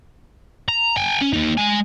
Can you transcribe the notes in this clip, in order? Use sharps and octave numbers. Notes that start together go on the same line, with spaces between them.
A#5
G5 G#5
C#4
A#3 D#4
G#3 G#5